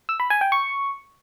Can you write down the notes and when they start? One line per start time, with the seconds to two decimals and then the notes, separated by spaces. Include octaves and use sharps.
0.09 E6
0.20 B5
0.30 G#5
0.41 G5
0.52 C#6